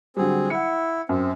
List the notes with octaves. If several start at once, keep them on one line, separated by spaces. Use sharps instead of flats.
D3 F#3 G3 C4 G#4
E4 F#5 C#7
F#2 C4